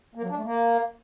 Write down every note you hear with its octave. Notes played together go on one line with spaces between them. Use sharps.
A#3
F#3
D4
A3
A#3